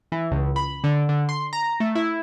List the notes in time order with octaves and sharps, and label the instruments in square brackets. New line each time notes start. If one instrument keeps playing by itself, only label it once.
[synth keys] E3
C#2
B5
D3
D3
C6
A#5
A3
E4